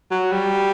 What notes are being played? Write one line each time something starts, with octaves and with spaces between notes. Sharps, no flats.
F#3
G3